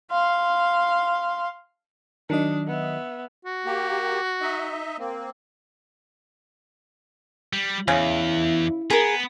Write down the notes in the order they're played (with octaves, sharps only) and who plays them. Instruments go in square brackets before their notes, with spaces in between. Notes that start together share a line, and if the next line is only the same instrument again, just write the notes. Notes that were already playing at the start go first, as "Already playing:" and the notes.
[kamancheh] F5 C6
[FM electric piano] D#3 F#3 D#5 [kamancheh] D4
[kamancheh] B3 E5
[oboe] F#4
[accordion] A#3 G4
D#4 D#5 E5
A#3 C4
[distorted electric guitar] G3
[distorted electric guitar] E2 [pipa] C#3 [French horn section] E4
[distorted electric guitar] B3 [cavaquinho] G#4 A#4